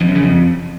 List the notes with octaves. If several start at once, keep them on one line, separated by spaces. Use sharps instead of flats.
F2
F#2
C#3
F2